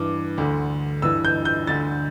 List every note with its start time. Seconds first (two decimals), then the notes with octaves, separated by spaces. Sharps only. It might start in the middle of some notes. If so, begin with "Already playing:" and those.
Already playing: G2 E3 D6
0.38 D2 D3
1.02 G2 E3 E6
1.25 G6
1.45 G6
1.67 D2 D3 A6